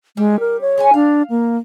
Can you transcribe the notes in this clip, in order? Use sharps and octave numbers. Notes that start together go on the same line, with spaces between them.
G3 G#3
A#4
C#5
G#3 C#4 G#5
D4 F5
A#3